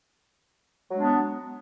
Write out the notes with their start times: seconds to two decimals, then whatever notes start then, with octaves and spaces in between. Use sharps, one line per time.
0.89 F#3
0.92 G#3
0.96 D4
1.00 B3